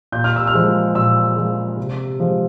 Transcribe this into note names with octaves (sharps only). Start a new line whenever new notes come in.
A#2 G6
F6
E6
F6
F3 G#3
A#2 E6
F3 G#3
C3
F3 G#3